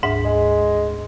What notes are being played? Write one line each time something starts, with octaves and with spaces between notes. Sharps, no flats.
D2 G#2 E5
G#3